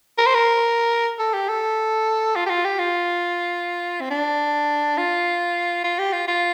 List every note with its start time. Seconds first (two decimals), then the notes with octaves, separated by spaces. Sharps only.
0.18 A#4
0.26 C5
0.35 A#4
1.19 A4
1.34 G4
1.49 A4
2.36 F4
2.46 G4
2.49 F4
2.65 G4
2.79 F4
4.01 C4
4.10 D4
4.97 F4
5.84 F4
5.99 G4
6.13 F4
6.28 F4